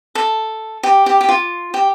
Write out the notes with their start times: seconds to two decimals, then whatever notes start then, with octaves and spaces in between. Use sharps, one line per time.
0.15 A4
0.83 G4
1.06 G4
1.21 G4
1.29 F4
1.74 G4